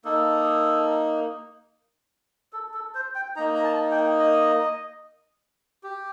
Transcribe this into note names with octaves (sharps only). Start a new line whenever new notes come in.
A#3 D#4 A4
A4
A4
C5
G5
A#3 D#4 A#5
A#5
A5
G5
D#5
G4